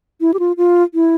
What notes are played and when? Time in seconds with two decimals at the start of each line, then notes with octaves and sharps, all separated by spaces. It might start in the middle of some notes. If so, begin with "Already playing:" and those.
0.21 E4
0.34 G4
0.39 F4
0.57 F4
0.94 E4